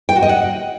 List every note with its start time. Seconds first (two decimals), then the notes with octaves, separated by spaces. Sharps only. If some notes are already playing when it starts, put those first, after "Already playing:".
0.09 G5
0.16 F#4
0.22 D#5
0.29 F#5